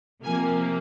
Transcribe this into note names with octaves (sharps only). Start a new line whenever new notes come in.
C3 F3 A#3 G#5